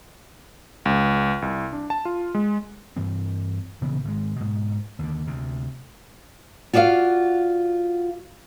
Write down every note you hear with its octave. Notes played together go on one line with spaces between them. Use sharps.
C#2
C2
D4
A5
F4
G#3
G2 E3 C4
A#1 C#3 E3 B3
G#1 G#3
G#2 B2
D#2 D3
D2 C3
F4 F#4 D5 D#5 F5